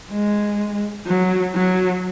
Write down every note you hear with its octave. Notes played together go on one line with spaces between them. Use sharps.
G#3
F#3
F#3